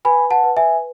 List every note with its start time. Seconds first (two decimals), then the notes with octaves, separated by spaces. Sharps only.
0.05 B4 G#5 B5
0.31 F#5 A5
0.44 B4
0.57 E5 G#5